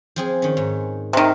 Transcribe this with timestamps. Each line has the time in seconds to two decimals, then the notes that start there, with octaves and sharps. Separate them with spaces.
0.16 F3 C4 G#4
0.42 D#3 C#4
0.57 G#2
1.13 C3 D#3